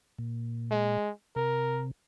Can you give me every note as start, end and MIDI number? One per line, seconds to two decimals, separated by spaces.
0.18 0.98 46
0.71 1.11 56
1.36 1.91 48
1.36 1.84 70